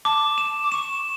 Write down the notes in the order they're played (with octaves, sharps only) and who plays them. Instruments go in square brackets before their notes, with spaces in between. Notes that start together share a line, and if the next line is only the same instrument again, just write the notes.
[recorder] A5 [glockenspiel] D6
[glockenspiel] E7
[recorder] D6
[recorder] C#6 [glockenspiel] E7